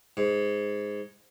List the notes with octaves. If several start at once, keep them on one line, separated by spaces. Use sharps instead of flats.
G#2